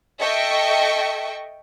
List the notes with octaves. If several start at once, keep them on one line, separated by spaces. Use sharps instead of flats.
A4 D#5 E5 G5 C#6